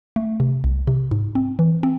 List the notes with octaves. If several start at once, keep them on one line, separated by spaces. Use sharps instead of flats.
A3
C3
C2
C3
G#2
C4
E3
C4